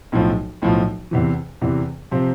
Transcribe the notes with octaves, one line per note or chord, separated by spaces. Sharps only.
B1 A2 F3
B1 A2 F3
E2 C3 E3
E2 C3 E3
C3 F3 C4